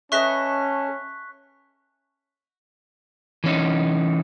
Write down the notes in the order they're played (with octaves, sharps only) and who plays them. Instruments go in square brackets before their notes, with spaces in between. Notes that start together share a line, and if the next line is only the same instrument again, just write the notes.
[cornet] C#4 [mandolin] A4 B4 D#5 [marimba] E5 [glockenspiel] C#6 F#6 B6
[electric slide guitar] E3 C#4 D#4